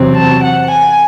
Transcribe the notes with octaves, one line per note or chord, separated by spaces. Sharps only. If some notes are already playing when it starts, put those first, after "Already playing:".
Already playing: E2 C3 F#3 C4
A5
F#5
G#5